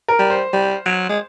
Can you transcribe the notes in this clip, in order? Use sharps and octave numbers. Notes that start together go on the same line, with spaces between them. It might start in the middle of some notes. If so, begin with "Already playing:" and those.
A#4
G3
C5
G3
F#3
G#3